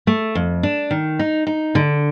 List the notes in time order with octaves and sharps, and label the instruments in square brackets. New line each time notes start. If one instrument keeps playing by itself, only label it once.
[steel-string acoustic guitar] A3
F2
D4
D#3
D#4
D#4
D3